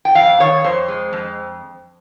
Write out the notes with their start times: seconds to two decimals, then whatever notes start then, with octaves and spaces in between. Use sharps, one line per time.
0.05 G5
0.15 F2 F5
0.40 D#3 C#5
0.64 F2 C5
0.88 G#3
1.13 F2